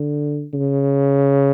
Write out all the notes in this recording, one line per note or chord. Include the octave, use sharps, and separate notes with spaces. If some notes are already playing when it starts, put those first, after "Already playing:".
Already playing: D3
C#3